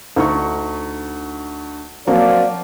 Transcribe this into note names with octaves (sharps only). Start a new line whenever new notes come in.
D2 D#4 C#6
F3 F#3 A#3 C4 D5